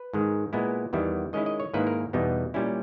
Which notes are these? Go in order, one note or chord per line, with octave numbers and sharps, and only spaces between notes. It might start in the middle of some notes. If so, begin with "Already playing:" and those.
Already playing: B4
G#2 D#3 G#3
A#2 G#3 B3 E4
E2 D#3 G3 B3 E4
D#3 G#3 C#4 E4 D#5
D#5
C#5
G#2 D#3 A#3 E4 B4
A#4
E2 B2 G3 B3 D#4
A#2 G3 C#4 E4